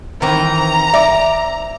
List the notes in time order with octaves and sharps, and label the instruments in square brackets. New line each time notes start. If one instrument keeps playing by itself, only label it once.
[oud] D#3 E3 C4 [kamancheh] A#5
[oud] D5 [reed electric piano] E5